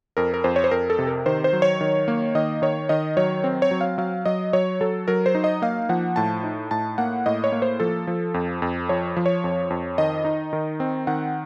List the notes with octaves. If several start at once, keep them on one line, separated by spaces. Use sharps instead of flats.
F2 A#4
A#4
F2 C5
C#5
C5
F2 A#4
A4
C3
A#4
D#3 C5
C5
F#3
C#5
D#3
A#3
D#3 D#5
D#3 C#5
D#3 D#5
F#3 C#5
C4
C#5
F#3
F5
F#3 F5
F#3 D#5
F#3 C#5
F#3 A4
F#3 A#4
C5
D#4
D#5
A#3 F5
F3 F#5
A2 A5
D#4
A2 A5
A#3 F#5
A2 D#5
C#5
A#3
C5
F3 A4
F3
F2
F2
F3 C#5
F3
C#5
F2
F2
D#3 D#5
D#4
D#3
C4
D#3 F#5